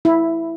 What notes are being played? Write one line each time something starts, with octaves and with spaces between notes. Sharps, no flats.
E4